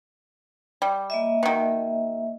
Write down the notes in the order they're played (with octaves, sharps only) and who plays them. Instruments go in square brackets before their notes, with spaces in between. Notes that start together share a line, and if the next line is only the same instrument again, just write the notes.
[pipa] G3
[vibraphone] A#3 D#5 E5
[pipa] B2 D#3